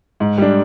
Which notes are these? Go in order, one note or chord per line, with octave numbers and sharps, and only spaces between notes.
G#2
G3 D4